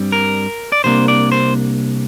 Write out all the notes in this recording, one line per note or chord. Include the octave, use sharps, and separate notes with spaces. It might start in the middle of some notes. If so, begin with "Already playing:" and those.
Already playing: G2 G3 C4
A#4
D5
C2 C3 A#3 D4 C5
D5
C5